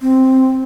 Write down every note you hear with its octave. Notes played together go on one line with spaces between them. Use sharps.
C4